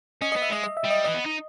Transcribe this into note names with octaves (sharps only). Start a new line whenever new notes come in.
C#4 D#5
D#5
B3
E5
G#3 D#5
D#5
E5
G3
D#5
E3 D#5
B3
D#4